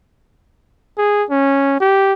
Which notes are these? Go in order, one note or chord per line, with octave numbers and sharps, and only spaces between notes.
G#4
C#4
G4